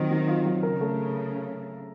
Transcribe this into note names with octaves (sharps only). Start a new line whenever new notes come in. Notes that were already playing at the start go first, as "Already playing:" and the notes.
Already playing: D#3 F#3 C4 F4
F#3
F4
F#3
C#3 A#4
A3